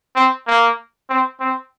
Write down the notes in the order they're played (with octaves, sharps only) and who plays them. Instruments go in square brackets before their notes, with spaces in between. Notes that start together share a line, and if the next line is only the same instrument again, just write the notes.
[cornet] C4
A#3
C4
C4